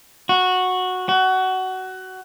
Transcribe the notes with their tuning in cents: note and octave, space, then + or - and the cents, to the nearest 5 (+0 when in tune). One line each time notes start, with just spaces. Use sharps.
F#4 -10
F#4 +20